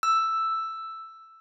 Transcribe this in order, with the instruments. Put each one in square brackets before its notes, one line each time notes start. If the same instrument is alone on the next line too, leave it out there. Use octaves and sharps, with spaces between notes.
[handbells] E6